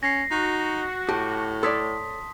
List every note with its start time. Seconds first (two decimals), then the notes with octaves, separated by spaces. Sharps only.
0.03 C#4 A#6 C7
0.31 D#4 F#4
1.09 A2 G4 A5
1.63 A4 C#5 D5 C6 D#6 B6